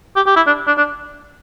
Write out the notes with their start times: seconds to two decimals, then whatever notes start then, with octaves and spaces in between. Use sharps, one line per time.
0.16 G4
0.26 G4
0.36 E4
0.47 D4
0.67 D4
0.78 D4